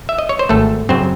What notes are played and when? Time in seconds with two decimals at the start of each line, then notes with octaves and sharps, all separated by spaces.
0.09 E5
0.18 D#5
0.29 C#5
0.39 C5
0.49 G#1 A3 A4
0.89 F#2 C#3 F#3 C4 C5